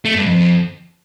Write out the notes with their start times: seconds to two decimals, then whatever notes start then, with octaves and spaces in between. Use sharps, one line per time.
0.05 A3
0.16 G2
0.26 F2